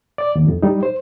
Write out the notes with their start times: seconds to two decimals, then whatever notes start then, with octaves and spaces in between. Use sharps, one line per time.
0.18 D5
0.35 D#2
0.48 F2
0.62 G3 D#4
0.83 C5